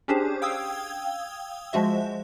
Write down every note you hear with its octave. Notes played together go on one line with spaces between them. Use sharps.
C#4 D4 G4 G#4 C5
F5 G5 D#6 E6 G#6
F3 G#3 F#4 E5